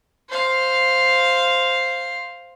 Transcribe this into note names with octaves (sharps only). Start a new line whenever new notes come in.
C5 F5